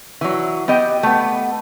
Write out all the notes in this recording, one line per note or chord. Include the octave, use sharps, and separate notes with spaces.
E3 F#3
B3 G4 D#5 G5
A3 B3